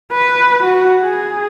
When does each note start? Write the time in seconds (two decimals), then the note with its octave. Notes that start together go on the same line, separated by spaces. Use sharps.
0.12 B4
0.64 F#4
1.02 G#4